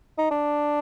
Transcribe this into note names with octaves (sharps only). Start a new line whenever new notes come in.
D#4
D4